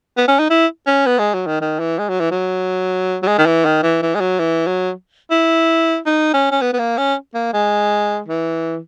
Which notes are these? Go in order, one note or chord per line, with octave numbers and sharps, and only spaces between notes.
B3
C#4
D#4
E4
C#4
B3
G#3
F#3
D#3
D#3
E3
G#3
F#3
E3
F#3
F#3
G#3
D#3
E3
D#3
E3
E3
G#3
F#3
E3
F#3
E4
D#4
C#4
C#4
B3
B3
A#3
C#4
A#3
G#3
E3